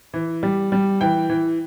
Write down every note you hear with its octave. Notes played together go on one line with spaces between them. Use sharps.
E3
G3
G3
E3 G5
E3